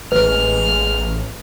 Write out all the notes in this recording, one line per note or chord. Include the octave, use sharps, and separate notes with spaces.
A1 G#3 B4 F6